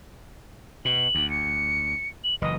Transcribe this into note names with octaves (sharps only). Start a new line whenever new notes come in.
B2 F#7
D2
C#7
F#7
F#1 E3 D#5